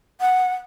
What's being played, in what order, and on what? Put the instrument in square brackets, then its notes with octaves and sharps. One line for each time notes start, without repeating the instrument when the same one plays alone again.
[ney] F#5